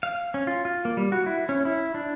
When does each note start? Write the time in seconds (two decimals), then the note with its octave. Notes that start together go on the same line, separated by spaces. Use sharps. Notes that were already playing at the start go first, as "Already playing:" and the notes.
0.03 F5
0.34 C#4
0.47 F4
0.65 F4
0.85 A#3
0.97 G3
1.12 F#4
1.26 E4
1.49 C#4
1.65 E4
1.95 D4